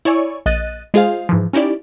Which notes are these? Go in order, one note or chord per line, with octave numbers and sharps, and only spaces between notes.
E4 C#5 D5 G#5 C#6
A#1 D#5 F#6 A6 D#7
G#3 F4 G#4 C5 F5
G#2 E3 F3
C#4 D#4 E4 G4 D5